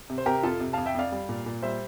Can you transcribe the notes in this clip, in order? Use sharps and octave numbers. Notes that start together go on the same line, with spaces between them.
C3
C5
C3 G4 A#4
F2 F4 A4
C3
F2 F5 A5
E5 G5
F2 D5 F5
G3
A#2
A#2
G3 C5 E5